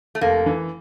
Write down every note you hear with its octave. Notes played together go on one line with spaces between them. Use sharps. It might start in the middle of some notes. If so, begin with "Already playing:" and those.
A3
F1 A#3
E3